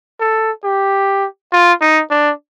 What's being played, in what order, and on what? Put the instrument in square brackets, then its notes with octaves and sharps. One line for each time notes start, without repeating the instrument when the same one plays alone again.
[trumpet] A4
G4
F4
D#4
D4